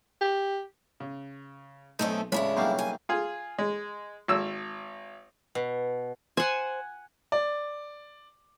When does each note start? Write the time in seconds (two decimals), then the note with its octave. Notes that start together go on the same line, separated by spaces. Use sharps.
0.21 G4
1.00 C#3
1.99 B1 A3 C4 C#4 D#4 A4 D#5
2.32 A1 C#3 G#3 C#4 D4 E4 B5
2.57 B1 F#3 G3 A#3 A#4 F5
2.79 G#5
3.09 F4 G#4
3.58 G#3
4.28 G#1 E6
5.55 B2
6.37 C5 F#5 G#5
7.32 D5